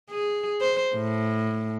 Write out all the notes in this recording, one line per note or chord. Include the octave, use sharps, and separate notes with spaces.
G#4
C5
A2